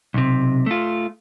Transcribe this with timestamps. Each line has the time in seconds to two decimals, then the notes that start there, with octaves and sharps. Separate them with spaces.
0.14 B1 C3
0.66 A3 F4